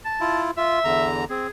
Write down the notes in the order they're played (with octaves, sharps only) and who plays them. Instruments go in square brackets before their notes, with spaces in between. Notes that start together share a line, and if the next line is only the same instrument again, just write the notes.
[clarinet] A5
[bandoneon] E4 F4
[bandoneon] F4 [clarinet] E5
[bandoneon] E2 D3 A#5
[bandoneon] C4 [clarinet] G#4